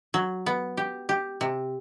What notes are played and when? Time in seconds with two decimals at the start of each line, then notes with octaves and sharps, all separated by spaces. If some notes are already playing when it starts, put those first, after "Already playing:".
0.14 F#3
0.46 B3
0.77 G4
1.09 G4
1.41 C3